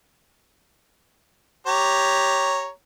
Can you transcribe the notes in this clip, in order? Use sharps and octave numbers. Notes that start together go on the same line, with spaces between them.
G4 C#5 A#5